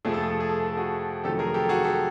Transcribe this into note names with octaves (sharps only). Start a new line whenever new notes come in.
F2 C3 F3 A3 G#4
A4
G#4
A4
G#4
A4
G#4
A4
F#4 G#4
F2 C3 D#3 F#3 A3 G4 A4
G#4 A#4
G4 A4
F#4 G#4
G4 A4